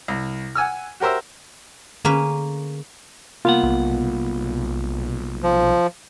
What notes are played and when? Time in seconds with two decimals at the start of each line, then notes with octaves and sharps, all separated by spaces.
0.08 C2
0.55 F#5 G#5 E6 F6
1.00 F#4 G4 A#4 C5 E5
2.05 D3 A#3 C#4 G#4 B4
3.45 C2 A#3 B3 F4 F#5
3.63 B1
5.43 F3